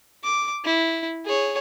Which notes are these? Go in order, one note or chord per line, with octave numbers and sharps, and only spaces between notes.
D6
E4
G#4 C#5